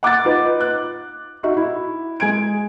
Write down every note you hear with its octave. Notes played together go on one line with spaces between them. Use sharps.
F#5 D6 F#6 A6
D#4 F4 B4
F#6
D#4 F#4 E5
E4
G#3 G#5 G#6 D7